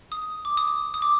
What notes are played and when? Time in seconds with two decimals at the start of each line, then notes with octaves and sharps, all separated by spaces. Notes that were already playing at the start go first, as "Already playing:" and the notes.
0.12 D#6
0.45 D6
0.57 D#6
0.94 D#6
1.02 D6